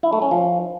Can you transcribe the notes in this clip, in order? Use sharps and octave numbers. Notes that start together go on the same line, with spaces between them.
E4
A3
C#4
F3